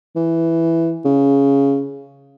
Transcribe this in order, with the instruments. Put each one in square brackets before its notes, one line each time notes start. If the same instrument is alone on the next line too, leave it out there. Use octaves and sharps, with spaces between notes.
[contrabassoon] E3
C#3